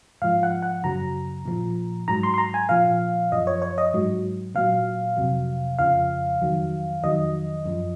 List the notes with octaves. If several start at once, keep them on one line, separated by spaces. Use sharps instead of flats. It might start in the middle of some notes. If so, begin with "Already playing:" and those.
G#2 F3 F5
F#5
F#5
F#2 C#3 F#3 A#5
A#2 F3
G#2 F#3 A#5
C6
C6
A#5
G#5
A#2 F3 F5
F#2 F3 D#5
C#5
C#5
D#5
G#2 F#3
A#2 F#3 F5
F2 C3 F#3
F2 C#3 F3 F5
F2 D#3 F#3
F2 D#3 F#3 D#5
F#2 F3